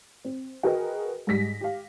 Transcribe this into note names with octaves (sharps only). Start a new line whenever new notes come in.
C4
F#4 G#4 A#4 B4 D#5 G5
G#2 G3 A#6 B6
G4 F5